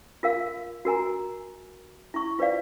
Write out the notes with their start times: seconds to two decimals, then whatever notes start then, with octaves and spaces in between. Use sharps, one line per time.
0.23 F4 A#4 F5
0.85 F#4 A#4 G#5 A#5
2.14 E4 C#6
2.39 F4 B4 C5 D5 F5